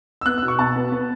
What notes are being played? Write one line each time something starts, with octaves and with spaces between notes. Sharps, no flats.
E6
B3 F#6
E6
B2
C#6
B2 A5
B3
B3